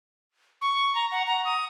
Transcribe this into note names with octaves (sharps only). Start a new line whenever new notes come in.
C#6
A#5
F#5
A#5
D#6